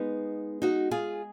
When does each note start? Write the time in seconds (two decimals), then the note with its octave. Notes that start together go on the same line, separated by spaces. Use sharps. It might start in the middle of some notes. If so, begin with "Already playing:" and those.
Already playing: G#3 B3 D#4
0.62 D#4 F#4
0.91 F4 G#4